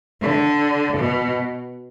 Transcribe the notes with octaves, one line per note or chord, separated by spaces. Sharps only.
D3
B2